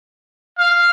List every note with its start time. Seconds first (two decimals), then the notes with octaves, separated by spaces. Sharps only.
0.59 F5